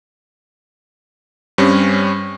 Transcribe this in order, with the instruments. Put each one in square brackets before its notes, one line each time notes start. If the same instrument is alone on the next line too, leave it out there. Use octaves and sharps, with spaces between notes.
[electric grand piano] G2 G3 C4 C#4